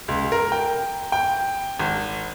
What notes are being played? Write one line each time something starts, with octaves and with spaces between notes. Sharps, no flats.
C#2
A#4
G5
G5
G#1